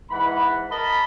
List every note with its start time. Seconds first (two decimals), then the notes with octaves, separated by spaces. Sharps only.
0.11 G#2 E3 F#5 B5
0.71 A#4 D#5 A5 B5